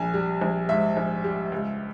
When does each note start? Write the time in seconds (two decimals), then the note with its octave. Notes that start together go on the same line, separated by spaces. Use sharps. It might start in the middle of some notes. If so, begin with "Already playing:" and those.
Already playing: A#1 G#5
0.14 G3
0.41 A#1
0.69 G#2 E5
0.97 A#1
1.24 G3
1.52 C#2